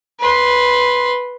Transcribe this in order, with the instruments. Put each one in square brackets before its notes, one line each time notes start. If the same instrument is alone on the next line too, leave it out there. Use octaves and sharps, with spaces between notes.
[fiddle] B4 C6